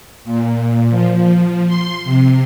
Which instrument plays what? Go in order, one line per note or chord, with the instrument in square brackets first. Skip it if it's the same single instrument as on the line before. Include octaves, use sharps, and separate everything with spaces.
[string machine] A#2
F3
C6
C3